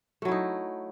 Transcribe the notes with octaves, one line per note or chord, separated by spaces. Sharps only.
F#3 A3 D#4 E4